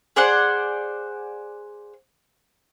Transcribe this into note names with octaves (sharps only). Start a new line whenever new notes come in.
G#4 C5 D5 F#5